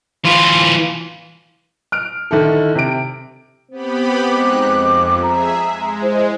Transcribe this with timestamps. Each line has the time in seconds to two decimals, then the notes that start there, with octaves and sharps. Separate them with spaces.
0.25 E3 F4
1.92 F6 D7
2.31 D3 D#3 E4 A4
2.75 C3 D7
3.71 B3 C4 G4 B5
4.31 G#3 D#4 D6 F#6
4.62 F2
5.23 G#4 E5 A#5
5.68 G#3
6.02 E4 C5